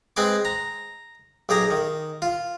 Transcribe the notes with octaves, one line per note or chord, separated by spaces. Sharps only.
G#3 C4 B4 G#5 D6
A#5
B1 G4 G#4 A#5
D#3
F4